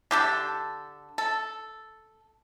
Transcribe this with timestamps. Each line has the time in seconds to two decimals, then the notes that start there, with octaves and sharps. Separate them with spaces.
0.11 D3 G4 A4
1.18 A4